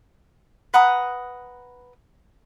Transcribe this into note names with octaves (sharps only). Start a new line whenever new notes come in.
B4 F#5 A#5 D#6